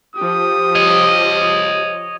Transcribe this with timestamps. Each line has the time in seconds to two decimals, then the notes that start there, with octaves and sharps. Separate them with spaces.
0.16 F3 G4 D#6
0.75 C#5 D#5